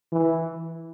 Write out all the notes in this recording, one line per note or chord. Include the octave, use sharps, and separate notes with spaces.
E3